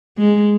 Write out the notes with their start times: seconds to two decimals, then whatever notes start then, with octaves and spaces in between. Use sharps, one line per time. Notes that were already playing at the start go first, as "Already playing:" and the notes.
0.18 G#3